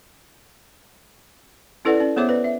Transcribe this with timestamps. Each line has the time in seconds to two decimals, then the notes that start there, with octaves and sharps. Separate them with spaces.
1.85 C#4 E4 A4 B4 D5 F#5
1.97 C#4 D5
2.16 B3 G#4 C5 C#5 E5 D6
2.29 B4 D5
2.44 E5